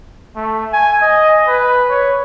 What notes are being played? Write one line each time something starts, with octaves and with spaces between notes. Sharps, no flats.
A3
G#5
D#5
B4
C#5